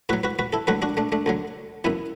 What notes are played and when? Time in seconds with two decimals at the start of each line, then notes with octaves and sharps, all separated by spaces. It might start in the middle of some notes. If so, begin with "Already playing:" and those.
0.09 A2 F#3 F#4 B4
0.24 F#4 B4
0.39 F#4 B4
0.53 E4 A4
0.67 D2 D3 F#3 F#4 B4
0.82 D4 F#4
0.97 A3 D4
1.12 A3 D4
1.26 D2 D3 F#3
1.84 F#2 E3 B3 E4